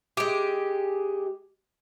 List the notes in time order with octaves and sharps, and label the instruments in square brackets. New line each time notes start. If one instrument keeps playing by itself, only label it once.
[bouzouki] G#3 G4